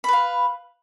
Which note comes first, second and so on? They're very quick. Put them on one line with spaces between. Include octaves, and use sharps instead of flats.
B5 B4 F5